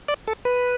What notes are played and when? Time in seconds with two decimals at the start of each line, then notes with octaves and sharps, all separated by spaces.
0.08 D5
0.28 A4
0.45 B4